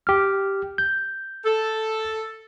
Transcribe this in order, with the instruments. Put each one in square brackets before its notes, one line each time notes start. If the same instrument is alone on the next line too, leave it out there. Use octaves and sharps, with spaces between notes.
[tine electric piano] G4 F6
G6
[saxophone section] A4